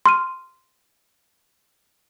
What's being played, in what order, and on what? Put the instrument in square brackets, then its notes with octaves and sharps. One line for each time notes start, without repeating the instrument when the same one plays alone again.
[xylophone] C6 F6 D#7